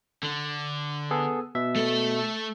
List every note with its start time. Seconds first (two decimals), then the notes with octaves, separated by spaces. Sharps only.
0.23 D3
1.11 B3 G#4 A4
1.55 B2 E5
1.76 A3 A4